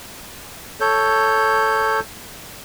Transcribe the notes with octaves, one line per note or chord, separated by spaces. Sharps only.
A4 C#5 G6